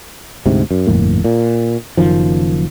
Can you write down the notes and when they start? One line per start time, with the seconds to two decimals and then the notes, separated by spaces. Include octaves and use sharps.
0.46 D2 G#2 C3
0.71 F#2
0.87 G1 F2 A2 A#3
1.24 A#2
1.97 F#1 F#2 D#3 F3